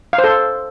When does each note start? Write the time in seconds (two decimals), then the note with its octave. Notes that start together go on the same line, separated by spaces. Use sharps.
0.13 F5
0.18 C5
0.24 A4